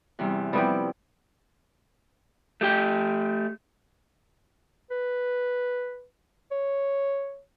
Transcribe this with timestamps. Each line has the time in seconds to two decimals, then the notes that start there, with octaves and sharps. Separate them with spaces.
0.19 E2 C3 G3
0.53 F3 G3 B3 C4 E4 G4
2.61 A3 G4 G5
4.91 B4
6.51 C#5